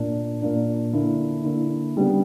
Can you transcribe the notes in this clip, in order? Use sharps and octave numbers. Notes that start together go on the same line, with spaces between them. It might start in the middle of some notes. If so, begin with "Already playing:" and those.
Already playing: A#2 A#3 D4
A#2 A#3 D4
D3 A#3 E4
D3 A#3 E4
C#3 G3 B3 D4